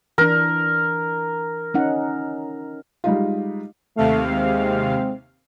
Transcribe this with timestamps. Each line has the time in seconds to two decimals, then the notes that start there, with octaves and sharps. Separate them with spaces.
0.18 E3 D4 A#4
1.74 C#4 D#4 F#5
3.04 G3 G#3 D#4 F4
3.97 D#2 C3 A3 F5
4.30 G#3 C4